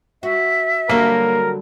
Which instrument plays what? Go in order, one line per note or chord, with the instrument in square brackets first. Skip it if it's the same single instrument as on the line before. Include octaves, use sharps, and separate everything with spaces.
[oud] F#4 [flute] E5
[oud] D3 F#3 G3 [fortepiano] A#3 [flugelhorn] A#4